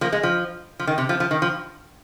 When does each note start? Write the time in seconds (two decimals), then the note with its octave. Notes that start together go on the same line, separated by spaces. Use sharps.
0.01 F3 A#3
0.12 G#3
0.23 F3
0.79 F3
0.87 D#3
0.98 C3
1.09 F3
1.20 F3
1.31 D#3
1.42 F3